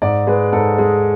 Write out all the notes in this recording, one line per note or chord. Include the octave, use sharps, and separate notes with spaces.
G#2 D5
G#3 B4
G#2 A4
G#3